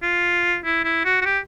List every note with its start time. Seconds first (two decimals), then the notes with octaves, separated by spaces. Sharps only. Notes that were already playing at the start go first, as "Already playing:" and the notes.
0.03 F4
0.65 E4
0.85 E4
1.05 F#4
1.22 F#4
1.25 G4